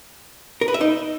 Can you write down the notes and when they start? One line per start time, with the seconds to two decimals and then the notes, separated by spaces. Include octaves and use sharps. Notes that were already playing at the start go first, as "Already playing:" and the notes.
0.61 A#4
0.68 B4
0.74 E5
0.81 D#4